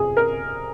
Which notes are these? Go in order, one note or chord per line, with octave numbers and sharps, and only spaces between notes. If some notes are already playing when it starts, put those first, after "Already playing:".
Already playing: F2 C3 G#4
A#4